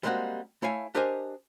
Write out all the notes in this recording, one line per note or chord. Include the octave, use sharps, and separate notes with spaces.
G3 G#3 A#3 C4 D#4 F#4
A3 E4 C#5 F5 G#5
D4 G4 A#4 C5 D#5 G#5